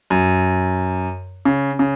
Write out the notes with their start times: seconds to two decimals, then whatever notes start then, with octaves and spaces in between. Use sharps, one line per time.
0.10 F#2
1.45 C#3
1.79 C#3